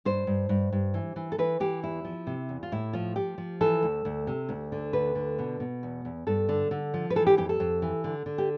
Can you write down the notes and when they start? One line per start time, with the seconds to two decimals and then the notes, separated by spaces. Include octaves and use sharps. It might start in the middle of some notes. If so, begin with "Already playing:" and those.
0.05 G2 C5
0.27 G2
0.49 G2
0.72 G2
0.94 E3
1.16 E3
1.32 A4
1.38 E3 B4
1.60 E3 G4
1.83 E2 E4
2.05 F3
2.27 C3
2.49 E2
2.63 F4
2.72 A2 E4
2.93 F3 F4
3.16 F3 G4
3.38 F3
3.61 E3 A4
3.83 D2
4.05 D2
4.27 C3
4.49 D2
4.72 D3
4.93 D2 B4
5.15 D3
5.39 B2
5.60 B2
5.83 E2
6.05 E2
6.27 G2 A4
6.49 D3
6.71 D3
6.94 F3
7.10 B4
7.16 E3 A4
7.27 G4
7.37 F2 G4
7.49 A4
7.60 F2
7.82 E3
8.04 D3
8.26 D3
8.38 G4